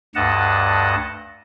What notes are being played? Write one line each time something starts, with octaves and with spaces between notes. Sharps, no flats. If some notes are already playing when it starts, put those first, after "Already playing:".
D2 G2 D#5 F#5 A5